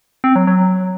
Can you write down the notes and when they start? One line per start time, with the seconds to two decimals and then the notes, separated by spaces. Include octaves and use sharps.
0.24 C4
0.36 F#3
0.47 F#3